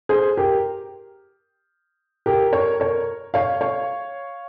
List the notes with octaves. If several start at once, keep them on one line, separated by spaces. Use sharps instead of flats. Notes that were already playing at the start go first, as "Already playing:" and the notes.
G#4 C5
G4 A#4
G4 A#4
A#4 C#5
A#4 C#5
C#5 F5
C#5 F5